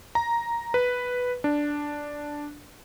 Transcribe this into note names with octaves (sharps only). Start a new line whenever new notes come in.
A#5
B4
D4